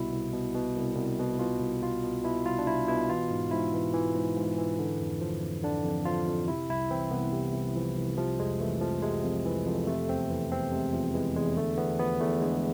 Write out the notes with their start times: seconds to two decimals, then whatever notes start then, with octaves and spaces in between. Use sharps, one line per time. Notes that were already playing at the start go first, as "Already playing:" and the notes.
Already playing: C2 B2 E4
0.13 C2
0.33 B2
0.55 B2
0.76 C2
0.97 C2
1.19 B2
1.39 B2 F4
1.60 C2
1.82 C2 F4
2.03 B2
2.24 B2 E4
2.45 C2 F4
2.59 D4
2.66 C2 E4
2.88 B2 E4
3.09 E3 F4
3.30 G#2
3.51 G#2 E4
3.73 E3
3.94 E3
4.15 G#2
4.36 G#2
4.58 E3
4.79 D3
5.00 F2
5.21 F3
5.43 F2
5.63 D3 D4
5.84 F2
6.05 F3 F4
6.27 F2
6.48 C3 E4
6.69 C2 E4
6.90 E3 C4
7.11 C2 B3
7.33 C3
7.54 C2
7.75 E3 F3
7.96 C2
8.17 C3 F3
8.39 F2 G#3
8.60 E3 A3
8.81 F2 F3
9.02 C3 G#3
9.24 F2
9.45 E3
9.66 F2
9.87 C3 A3
10.09 E2 C4
10.30 E3
10.50 E2 C4
10.72 C3 G#3
10.93 E2 F3
11.14 E3 G#3
11.36 E2 G#3
11.57 D3 A3
11.78 E2 B3
11.99 F3 B3
12.21 E2 A3
12.41 D3 G#3